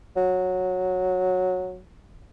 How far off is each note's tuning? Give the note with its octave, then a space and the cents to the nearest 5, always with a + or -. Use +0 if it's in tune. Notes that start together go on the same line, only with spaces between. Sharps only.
F#3 -10